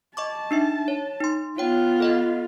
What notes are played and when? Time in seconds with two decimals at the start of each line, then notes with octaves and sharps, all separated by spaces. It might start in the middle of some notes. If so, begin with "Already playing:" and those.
0.17 D#5 A5 C#6 D6
0.51 D4 D#4 E5
0.88 C#5
1.21 D#4 C6
1.58 B3 F4 C#5 G5
2.00 A4 D#5 F5